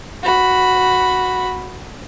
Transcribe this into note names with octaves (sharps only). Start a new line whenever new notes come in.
F#4 B5